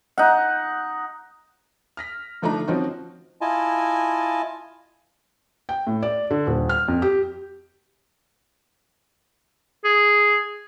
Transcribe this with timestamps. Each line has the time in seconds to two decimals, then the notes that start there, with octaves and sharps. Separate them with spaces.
0.18 D#4 F#5
1.97 F6 A#6 B6
2.42 D3 F3 A3 D4 D#4 A#5
2.67 F3 C4 C#4 D#4 F#4
3.41 E4 F4 D#5 G#5 A5
5.69 G5
5.87 A2
6.02 D5
6.31 D3
6.47 D#1
6.69 F6
6.88 F2
7.02 G4
9.85 G#4